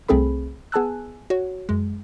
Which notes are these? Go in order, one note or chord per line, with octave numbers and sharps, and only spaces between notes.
C2 A3 C4 G#4 A4 B5
B3 G#4 G#5 A5 E6 F#6
F#4 C#5
F#2 G#3